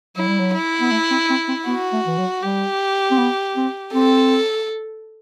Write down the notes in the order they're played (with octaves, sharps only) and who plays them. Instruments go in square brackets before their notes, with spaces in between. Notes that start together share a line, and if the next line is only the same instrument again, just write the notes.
[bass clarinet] F#3 [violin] E4
[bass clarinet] G3
F#3
[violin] E4
[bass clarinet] B3
A3
C4
C4
C4
[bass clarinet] B3 [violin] F#4
[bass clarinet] A3
E3
F#3
[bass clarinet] G3 [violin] G4
[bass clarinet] C4
B3
C4
[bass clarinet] C4 [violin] A4